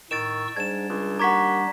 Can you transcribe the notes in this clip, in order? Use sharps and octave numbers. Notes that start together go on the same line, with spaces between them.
A2 D#3 C#6 E6 A6 D7 E7
G#2 G3 D4 G#6 E7
C#2
D#2 F#5 A#5 C#6 D6 G#6 B6